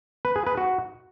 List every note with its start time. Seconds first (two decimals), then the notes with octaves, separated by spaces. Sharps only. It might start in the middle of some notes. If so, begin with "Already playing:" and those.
0.25 B4
0.36 G#4
0.47 B4
0.57 F#4